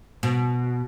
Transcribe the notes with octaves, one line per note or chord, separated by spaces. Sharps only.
B2